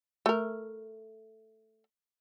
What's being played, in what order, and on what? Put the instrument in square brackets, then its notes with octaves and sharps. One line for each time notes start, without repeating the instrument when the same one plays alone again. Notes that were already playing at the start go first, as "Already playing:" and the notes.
[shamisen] A3 A#4